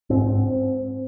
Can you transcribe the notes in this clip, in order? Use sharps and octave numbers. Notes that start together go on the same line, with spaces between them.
G#2 C4
G#2